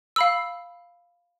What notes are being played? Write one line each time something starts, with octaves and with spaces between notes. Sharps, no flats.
F5 B5 E6